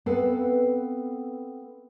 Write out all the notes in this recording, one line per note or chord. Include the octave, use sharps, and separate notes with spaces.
B3 C4 A4 B4 F5 F#5